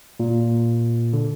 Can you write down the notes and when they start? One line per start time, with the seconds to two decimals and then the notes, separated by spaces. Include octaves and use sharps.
0.20 A#2
1.13 D3